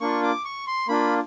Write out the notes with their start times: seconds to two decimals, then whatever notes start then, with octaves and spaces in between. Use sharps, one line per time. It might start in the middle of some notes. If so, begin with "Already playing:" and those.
0.01 A#3 D4 F4 C#6
0.23 D6
0.45 C#6
0.67 C6
0.88 A#3 D4 F4 B5